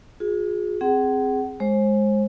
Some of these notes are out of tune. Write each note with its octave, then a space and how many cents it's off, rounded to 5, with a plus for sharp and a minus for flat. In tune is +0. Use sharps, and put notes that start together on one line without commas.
F4 +45 G#4 +0
C4 +0 G#4 +0 F#5 +35
G#3 +0 C5 +35